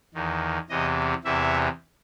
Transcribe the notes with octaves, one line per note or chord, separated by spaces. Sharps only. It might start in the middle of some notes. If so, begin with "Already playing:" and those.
E2 D#3
E2 C3 E3 D#5
E2 C3 E3 E5